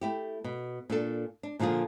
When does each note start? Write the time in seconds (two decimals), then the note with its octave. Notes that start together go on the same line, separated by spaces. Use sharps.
0.01 A3 E4 G4
0.44 B2
0.90 A#2 D4 A4
1.43 D4
1.59 A#2 D3 F3 F4 G#4